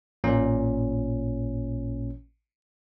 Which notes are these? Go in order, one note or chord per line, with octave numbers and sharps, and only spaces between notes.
A1 A#2 C#4